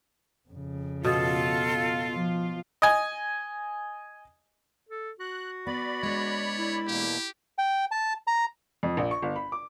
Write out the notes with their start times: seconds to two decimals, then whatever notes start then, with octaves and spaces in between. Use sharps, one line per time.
0.49 F2 C#3
1.04 B2 F4 A4
2.10 F3
2.82 D#5 G#5
4.89 A4
5.20 F#4 F#6
5.67 B3 D5 B5
6.03 G#3 B3 D4 C#5
6.58 E4
6.87 E2 B2 A#3 G4
7.58 G5
7.91 A5
8.27 A#5
8.83 F2
8.97 A#1
9.11 C#6
9.23 G1
9.36 B5
9.52 D6